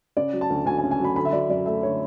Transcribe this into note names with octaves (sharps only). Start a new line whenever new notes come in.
C#3 D5
F#3
A5
D2
D2 G#5
G#5
C#3
G#5
F#3 B5
D3 B5
E5
F#3 D5
F#2 D5
A3 E5
D3 C#5